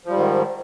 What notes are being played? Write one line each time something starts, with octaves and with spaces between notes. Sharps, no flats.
G#2 D#3 F3 G3